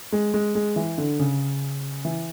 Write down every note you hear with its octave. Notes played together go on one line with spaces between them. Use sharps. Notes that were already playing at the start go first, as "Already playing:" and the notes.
G#3
G#3
G#3
E3
D3
C#3
E3